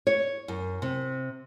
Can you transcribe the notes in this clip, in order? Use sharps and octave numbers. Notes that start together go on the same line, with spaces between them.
C#5
F#2
C3